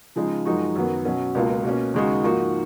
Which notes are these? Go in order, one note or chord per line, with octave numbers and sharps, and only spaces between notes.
C#3 F3 G#3 D#4
F#2 F3 G#3 D#4 F#4
F#2 D#3 F#3 B3
B2 F#3 C#4
C#2 B2 A#3 F4
B2 A#3 C#4
D#2 C#3 G#3 D#4 F#4
G#2 F3 A#3 D#4 F#4